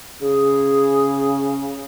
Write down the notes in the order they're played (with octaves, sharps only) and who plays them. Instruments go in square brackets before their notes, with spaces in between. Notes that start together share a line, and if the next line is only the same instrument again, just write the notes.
[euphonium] C#3 [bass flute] G#4